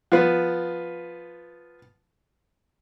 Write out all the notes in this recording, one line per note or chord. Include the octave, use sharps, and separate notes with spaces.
F3 B3